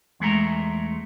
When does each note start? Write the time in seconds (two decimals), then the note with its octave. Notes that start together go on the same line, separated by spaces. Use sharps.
0.20 E2 G#3 A3 A#5